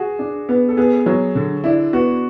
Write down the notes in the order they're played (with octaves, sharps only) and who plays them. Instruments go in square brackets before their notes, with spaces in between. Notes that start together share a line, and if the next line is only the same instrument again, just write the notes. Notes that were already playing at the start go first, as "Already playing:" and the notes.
Already playing: [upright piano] F#4 [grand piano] G#4
[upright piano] D4
B3
[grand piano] A4
[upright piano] B3 [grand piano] G#4
[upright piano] F#3
D3
[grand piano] D4 [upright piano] E4
[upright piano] B3 [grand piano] F#4